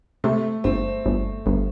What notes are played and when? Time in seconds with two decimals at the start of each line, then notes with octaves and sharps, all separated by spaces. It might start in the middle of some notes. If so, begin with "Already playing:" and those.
0.24 C3 A3
0.64 G1 C4
1.06 G1
1.46 G1